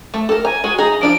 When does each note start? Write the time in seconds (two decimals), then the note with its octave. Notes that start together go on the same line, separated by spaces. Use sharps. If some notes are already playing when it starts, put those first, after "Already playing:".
0.14 A3
0.29 A4 A#4
0.45 G#5 A#5
0.64 G#3 F#4
0.78 D#4 G#4 A#5
1.01 F3 D4 F4 D7